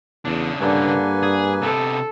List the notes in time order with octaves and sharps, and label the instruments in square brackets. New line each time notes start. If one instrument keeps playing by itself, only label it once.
[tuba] E2 [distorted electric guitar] C#3 D4
[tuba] G2 [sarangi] D3 [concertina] A#3 B4 G#5
[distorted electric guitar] G#4
[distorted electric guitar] C3 B3 [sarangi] A4